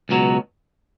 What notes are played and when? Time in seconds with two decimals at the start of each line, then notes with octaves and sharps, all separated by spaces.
0.09 C#2 B2 F#3